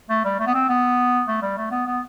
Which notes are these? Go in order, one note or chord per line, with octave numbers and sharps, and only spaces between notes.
A3
G3
A3
B3
C4
B3
A3
G3
A3
B3
B3